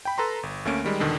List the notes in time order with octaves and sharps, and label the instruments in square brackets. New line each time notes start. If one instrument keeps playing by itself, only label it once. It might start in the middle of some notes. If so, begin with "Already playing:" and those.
[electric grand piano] G5 B5
A4 B4 A#5 C6
G1
D2 A3 A#3 C#4 D7
D#3 G3 G#3
E2 B2 D3 D#3